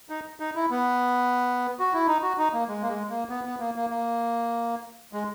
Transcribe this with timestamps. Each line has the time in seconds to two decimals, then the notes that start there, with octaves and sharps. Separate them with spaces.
0.09 D#4
0.40 D#4
0.55 E4
0.70 B3
1.80 F#4
1.93 E4
2.07 D#4
2.22 F#4
2.38 D#4
2.53 A#3
2.68 G#3
2.83 A#3
2.89 G#3
3.10 A#3
3.29 B3
3.45 B3
3.60 A#3
3.76 A#3
3.90 A#3
5.13 G#3